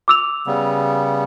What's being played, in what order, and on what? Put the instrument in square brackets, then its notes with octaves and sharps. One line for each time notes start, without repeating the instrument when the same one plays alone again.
[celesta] D6 E6 F7
[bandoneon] C#3 G3 B3